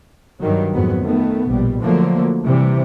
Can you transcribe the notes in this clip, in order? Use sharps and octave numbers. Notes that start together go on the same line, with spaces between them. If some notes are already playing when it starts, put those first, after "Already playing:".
G2 D#3 F#3
F2 G#2 F#3 B3
D#3 A3 B3
A#1 B2 G3
D3 F3 F#3 A3 A#3
C3 E3 G3